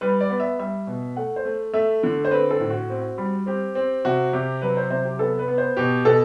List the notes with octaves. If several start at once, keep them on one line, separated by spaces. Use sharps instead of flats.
G3 B4
D5
B3
E5
G3 E5
B2
A3 F#5
C5
A3
A3 E5
D3
C5
C4 B4
A4
A2
F#4
C4
G3
C4 G4
C4
C3 F#4
C3 G4
F#3 B4
C5
C3 C5
G4
B3 A4
B4
B3
C5
B2 G4
B2 A4